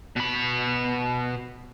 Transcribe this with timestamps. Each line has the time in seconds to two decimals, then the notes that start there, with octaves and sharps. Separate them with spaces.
0.16 B2 B5